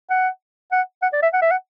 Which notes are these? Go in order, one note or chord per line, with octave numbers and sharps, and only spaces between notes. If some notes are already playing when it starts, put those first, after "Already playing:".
F#5
F#5
F#5
D5
E5
F#5
E5
F#5